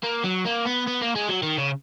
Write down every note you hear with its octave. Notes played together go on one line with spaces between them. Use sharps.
A#3
F#3
A#3
B3
B3
A#3
G#3
F#3
D#3
C#3